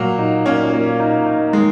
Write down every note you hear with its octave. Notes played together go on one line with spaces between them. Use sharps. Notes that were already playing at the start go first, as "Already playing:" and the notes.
Already playing: A#2 F#3 A#3
D#4
A#2 A#3 C#4
A#3
D#4
D#4
D#3 G#3